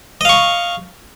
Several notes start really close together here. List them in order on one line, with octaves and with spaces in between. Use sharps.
D#5 F5 C#6